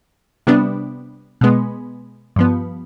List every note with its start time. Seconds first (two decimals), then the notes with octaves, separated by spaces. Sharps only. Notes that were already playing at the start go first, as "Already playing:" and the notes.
0.47 C3 G3 B3 D4
1.41 B2 G#3 B3
2.36 G2 F3 B3